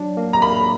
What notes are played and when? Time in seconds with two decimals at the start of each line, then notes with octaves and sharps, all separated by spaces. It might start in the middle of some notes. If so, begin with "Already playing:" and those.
Already playing: F#3 D4
0.17 A#3
0.33 A#5
0.42 A#3 B5